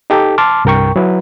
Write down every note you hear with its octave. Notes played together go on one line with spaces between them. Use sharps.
D#4 G4 A4
A5 C6 D6 F6
C2 G2 A#4 G5 C#6
F#3 E4 B4